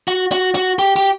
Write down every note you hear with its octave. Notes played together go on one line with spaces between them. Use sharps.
F#4
F#4
F#4
G4
G4